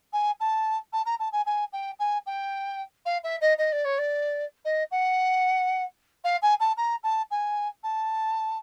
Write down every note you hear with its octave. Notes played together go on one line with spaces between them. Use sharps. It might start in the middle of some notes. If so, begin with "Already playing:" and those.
G#5
A5
A5
A#5
A5
G#5
G#5
G5
G#5
G5
F5
E5
D#5
D#5
D5
C#5
D5
D#5
F#5
F5
G#5
A5
A#5
A5
G#5
A5